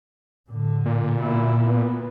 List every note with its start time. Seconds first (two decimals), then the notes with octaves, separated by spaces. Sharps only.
0.49 A2 D3
0.86 A#2
1.17 B2 E4
1.68 B3